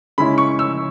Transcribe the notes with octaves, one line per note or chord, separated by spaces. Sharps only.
C#3 G#3 C#4 E4 B5
C#6
E6